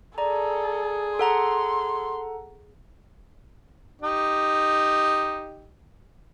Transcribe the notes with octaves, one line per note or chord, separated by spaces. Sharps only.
G#4 A4 D5 A#5
A4 F#5 A#5 C6
D#4 G4